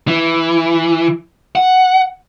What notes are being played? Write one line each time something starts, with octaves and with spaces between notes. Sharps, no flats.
E3
F#5